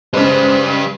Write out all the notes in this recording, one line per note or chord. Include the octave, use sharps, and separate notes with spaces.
C#3 G3 G#3 B4 C5